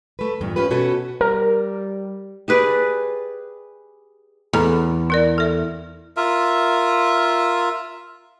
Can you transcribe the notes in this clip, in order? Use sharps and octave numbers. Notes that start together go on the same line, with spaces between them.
A3 B4
E2 G2 A#2
C#4 F4 G4 B4
B2 C#4 F#4 A4 B4
G3 A#4
G4 G#4 B4 D5
E2 A4 A#5
E4 A#4 D5
A4 E5
F4 A#4 E5